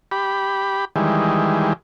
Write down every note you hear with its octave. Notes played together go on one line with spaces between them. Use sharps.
G4 B5
D#3 E3 G3 G#3